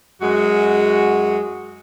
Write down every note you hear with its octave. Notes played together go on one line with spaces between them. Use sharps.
F#2 G#3 F#4